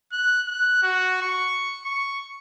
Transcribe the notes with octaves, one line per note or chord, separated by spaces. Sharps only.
F#6
F#6
F#4
C#6
C#6